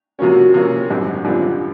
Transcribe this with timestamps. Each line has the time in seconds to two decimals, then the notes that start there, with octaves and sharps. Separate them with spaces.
0.19 C3 F3 A#3 C#4 F#4
0.54 C3 F3 A#3 C#4
0.90 G#1 F#2 D3 G3 C4
1.25 G#1 F#2 D3 G3 C4 F4